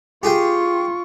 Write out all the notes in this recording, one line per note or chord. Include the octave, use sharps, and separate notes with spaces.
F4 G4 G#4 G5 C#6